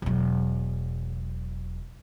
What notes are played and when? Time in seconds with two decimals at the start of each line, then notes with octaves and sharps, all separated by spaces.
0.02 E1 F#3